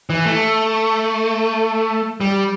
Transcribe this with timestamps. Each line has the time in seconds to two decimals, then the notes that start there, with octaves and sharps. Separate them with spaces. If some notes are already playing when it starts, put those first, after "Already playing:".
0.10 E3
0.26 A3
2.21 G3